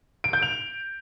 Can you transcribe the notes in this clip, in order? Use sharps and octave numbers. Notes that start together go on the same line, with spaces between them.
D7
G6
F7